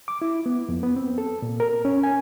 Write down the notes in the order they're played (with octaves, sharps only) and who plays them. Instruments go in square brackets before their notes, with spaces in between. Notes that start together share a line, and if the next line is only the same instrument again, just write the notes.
[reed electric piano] D6
E4
B3
F2
B3
C4
A4
A#2
A#4
C#4
G#5